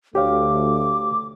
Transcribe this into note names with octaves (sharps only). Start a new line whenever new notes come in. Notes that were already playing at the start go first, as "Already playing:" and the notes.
D2 A3 G4 C#5 F5 D6